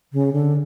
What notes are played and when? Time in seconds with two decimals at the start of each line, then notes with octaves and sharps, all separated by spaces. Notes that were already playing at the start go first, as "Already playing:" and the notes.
0.13 C#3
0.33 D3